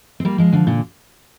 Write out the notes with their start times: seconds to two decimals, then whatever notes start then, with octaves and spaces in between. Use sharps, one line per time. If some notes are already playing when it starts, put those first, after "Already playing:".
0.20 C4
0.25 G3 A#3
0.38 F3 G#3
0.53 D3 F3
0.67 A#2 D3